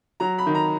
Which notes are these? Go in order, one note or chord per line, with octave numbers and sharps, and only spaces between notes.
F#3 A#5
B5
D#3
A#5